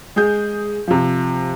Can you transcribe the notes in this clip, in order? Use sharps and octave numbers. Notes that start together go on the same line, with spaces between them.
G#3 G#4 G6
C3 F3